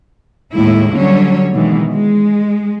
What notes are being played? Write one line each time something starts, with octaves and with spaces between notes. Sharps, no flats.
D#2 A2 G#3 A3 E4
D3 F#3 G3 C#4 C#5
B2 D#3 E3 G#3
G#3